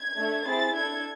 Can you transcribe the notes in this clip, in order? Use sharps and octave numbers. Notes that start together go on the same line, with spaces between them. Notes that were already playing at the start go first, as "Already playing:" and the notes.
Already playing: G#6
A3 D4 A4
C4 E4 G#4 A6
D4 A4 G#6